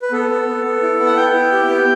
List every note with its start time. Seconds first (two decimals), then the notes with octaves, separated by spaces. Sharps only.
0.02 B4
0.12 B3 A4
0.30 B3
0.47 B3
0.65 B3
0.82 E4
1.00 B3
1.07 F#5
1.17 B3 G5
1.34 E4
1.52 G4
1.69 B3